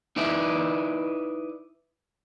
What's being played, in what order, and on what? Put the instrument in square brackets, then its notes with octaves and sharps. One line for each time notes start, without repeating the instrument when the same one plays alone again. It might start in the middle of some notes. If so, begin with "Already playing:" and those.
[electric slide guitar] D#4 E4 B4 D5 E5